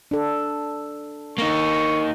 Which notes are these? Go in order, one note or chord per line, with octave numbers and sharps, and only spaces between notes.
D4 A4
A#3 D#4 C#6